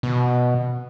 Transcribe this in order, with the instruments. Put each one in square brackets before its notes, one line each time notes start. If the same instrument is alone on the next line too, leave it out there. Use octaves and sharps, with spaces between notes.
[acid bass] B2